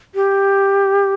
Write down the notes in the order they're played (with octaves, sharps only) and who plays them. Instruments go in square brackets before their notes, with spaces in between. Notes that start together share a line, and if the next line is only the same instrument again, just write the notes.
[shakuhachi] G4